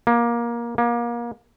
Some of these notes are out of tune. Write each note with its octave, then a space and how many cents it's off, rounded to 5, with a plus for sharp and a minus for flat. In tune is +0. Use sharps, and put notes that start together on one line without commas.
A#3 +20
A#3 +30